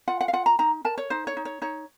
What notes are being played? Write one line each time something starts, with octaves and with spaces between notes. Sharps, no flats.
F4 F#5
F#5
F5
F4 F#5
A#5
D#4 A#5
A#4 A5
C#5
D#4 C5
C#5
D#4
C#5
D#4 C#5